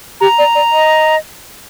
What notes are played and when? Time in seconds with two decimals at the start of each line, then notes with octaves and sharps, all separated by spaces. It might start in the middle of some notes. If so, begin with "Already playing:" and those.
0.21 G4 A#5
0.38 D5
0.55 D5
0.72 D#5